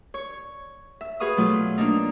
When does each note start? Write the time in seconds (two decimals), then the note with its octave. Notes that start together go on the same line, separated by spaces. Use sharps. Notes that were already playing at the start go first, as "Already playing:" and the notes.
0.14 C#5
1.01 E5
1.20 F#4 G#4 B4 F5 C#6 D#6
1.37 B2 F#3 A3 F4
1.78 A#3 D4 D#4